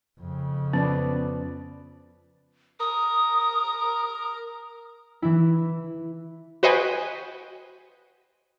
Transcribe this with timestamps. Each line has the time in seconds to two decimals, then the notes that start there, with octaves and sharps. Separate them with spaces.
0.20 F2 C#3
0.73 F3 B3 C#4 B4 D5
2.80 A#4 D#6
5.22 E3 E4
6.63 F#4 B4 C5 D#5 G5 G#5